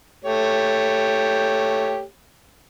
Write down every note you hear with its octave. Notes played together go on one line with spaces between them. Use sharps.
A3 G4 C#5